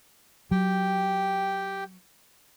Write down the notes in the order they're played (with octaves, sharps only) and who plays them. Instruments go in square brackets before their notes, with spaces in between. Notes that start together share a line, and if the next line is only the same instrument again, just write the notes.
[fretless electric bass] F#3 [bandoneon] G4 G5